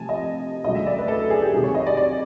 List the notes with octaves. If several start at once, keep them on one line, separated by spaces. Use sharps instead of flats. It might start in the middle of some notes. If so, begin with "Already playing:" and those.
Already playing: C3 F3 A3 G#5 A5
D#5
D2 C#3 F#3 A3 D#5
E5
D5
B4
A4
G#4
G4
C3 D#3 F#3 G#4
C#5
D#5
D5
D5